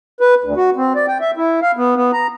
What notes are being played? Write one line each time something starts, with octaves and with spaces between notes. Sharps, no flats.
B4
D2
F#4
C4
D5
G5
E5
E4
F5
B3
B3
A#5